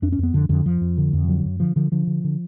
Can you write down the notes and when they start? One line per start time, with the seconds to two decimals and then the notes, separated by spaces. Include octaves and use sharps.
0.02 F2 D4
0.12 C#4
0.19 F2 B3
0.34 F2 D3
0.49 F2 D3
0.65 F2 F3
0.81 F2
0.98 D3
1.13 F2
1.28 D3 F#3
1.45 F#2
1.60 D3 F3
1.76 D3 F3
1.92 D3 F3
2.07 D3
2.24 D3